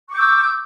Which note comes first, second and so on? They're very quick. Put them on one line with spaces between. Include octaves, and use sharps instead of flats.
C#6 D6 G6 E6